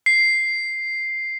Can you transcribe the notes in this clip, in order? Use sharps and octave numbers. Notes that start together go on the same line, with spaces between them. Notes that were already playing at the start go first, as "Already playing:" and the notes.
C7